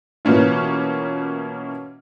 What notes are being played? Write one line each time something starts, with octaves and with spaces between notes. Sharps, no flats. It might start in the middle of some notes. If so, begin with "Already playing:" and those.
B2 E3 A#3 C#4 F4